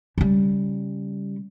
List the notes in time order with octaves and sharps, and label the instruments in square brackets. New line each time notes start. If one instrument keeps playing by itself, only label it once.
[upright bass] C#3 G3